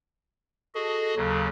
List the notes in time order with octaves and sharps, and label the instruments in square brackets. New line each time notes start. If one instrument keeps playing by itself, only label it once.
[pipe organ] F#4 G#4 D#5 [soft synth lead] A4
[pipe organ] D#2 C#3 F#3